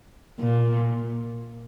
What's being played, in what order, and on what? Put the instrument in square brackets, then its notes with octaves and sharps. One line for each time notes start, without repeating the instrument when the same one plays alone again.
[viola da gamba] A#2